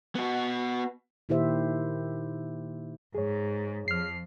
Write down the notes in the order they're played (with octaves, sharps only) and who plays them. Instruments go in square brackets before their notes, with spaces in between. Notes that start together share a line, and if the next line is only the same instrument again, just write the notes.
[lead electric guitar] B3 F#4
[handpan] A#2 D#3 E4 G4 C5 E5
[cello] G#2 [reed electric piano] G#4 C#5
[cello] F2 F3 [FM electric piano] F6 C7